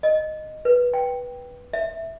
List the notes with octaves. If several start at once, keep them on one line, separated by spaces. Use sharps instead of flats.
D#5
B4
G5
E5